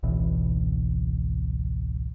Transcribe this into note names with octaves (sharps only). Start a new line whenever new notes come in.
G#1 C#2 B2 E3